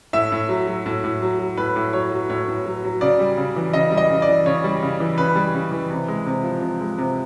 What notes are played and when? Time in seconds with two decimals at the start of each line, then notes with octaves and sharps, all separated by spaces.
0.13 A2 E5
0.32 A2
0.49 F#3
0.67 F#3
0.86 A2
1.04 A2
1.22 F#3
1.39 F#3
1.57 A2 B4
1.76 A2
1.93 F#3 C#5
2.12 F#3
2.30 A2 C#5
2.48 A2
2.66 F#3
2.84 F#3
3.01 C#3 D5
3.19 G3
3.37 C#3
3.56 E3
3.73 C#3 D#5
3.91 G3
3.97 D#5
4.10 C#3
4.22 D5
4.28 E3
4.46 C#3 C#5
4.64 G3
4.82 C#3
5.00 E3
5.18 C#3 B4
5.35 G3
5.54 C#3
5.71 E3
5.90 C3
6.08 G#3
6.26 C3
6.44 F3
6.62 C3
6.81 G#3
6.98 C3